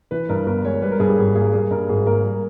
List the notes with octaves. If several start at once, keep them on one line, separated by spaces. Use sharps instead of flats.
E3 B4
G2 A#4
G1 A#4
G#3 C#5
G3 B4
A#4
G2 G#4
G4
G#1 G#4
A#3 G#4
G3 G#4
G2 A#4
G#1 G#4
A#3 A#4
G3